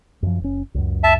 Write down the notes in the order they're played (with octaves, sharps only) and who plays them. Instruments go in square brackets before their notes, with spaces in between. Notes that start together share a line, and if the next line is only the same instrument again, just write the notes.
[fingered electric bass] F#2 F3
F#1 C#4
C#2 F#2
[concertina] E5 A5